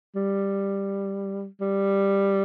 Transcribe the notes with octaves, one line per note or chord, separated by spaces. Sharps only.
G3
G3